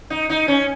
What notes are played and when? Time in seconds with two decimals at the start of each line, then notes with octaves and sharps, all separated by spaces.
0.10 D#4
0.30 D#4
0.48 C#4